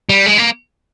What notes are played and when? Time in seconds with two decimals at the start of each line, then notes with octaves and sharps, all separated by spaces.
0.10 G3
0.26 G#3
0.38 A#3